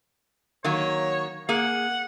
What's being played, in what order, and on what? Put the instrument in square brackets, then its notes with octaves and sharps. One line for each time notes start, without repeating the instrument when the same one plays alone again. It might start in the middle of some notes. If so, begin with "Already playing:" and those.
[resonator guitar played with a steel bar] D#3 F#3 A#3 [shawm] C#5
[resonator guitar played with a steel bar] A#3 G#4 [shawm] F#5